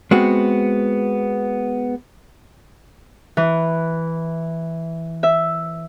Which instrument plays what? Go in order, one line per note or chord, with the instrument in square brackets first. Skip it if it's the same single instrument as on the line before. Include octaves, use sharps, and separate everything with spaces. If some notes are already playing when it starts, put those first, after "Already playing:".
[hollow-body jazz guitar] G#3 B3 C4 F#4
[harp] E3
E5